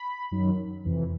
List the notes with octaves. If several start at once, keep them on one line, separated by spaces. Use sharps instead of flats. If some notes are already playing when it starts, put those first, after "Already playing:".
Already playing: B5
F#2 D#3 F#3
F2 C3 E3